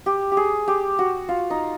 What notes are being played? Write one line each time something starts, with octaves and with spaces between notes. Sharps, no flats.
G4
G4
G#4
G4
F#4
F4
D#4